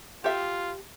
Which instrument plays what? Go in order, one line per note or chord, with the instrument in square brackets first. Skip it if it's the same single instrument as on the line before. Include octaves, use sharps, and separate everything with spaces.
[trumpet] F4 [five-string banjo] G4 A4 E5